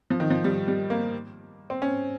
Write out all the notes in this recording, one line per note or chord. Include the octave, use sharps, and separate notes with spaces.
F3
D#3
F3
G3
G3
A#3
C4
C#4